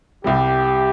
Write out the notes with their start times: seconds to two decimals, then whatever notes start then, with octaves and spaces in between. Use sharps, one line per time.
0.24 C2 C3 G3 G4